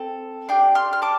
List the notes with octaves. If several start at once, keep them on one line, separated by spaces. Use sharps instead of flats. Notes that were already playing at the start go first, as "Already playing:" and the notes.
Already playing: C4 A4
D4 G4 G5 C6
C6 F6
F6
A5 D6